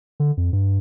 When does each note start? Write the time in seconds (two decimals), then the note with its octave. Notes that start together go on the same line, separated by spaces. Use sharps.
0.20 D3
0.37 F2
0.53 G2